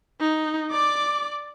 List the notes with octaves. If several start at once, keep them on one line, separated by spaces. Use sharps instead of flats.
D#4
D5 D6